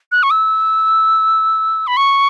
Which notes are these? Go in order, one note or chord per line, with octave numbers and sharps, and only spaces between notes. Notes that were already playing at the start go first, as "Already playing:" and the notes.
F#6
C#6
E6
B5
C#6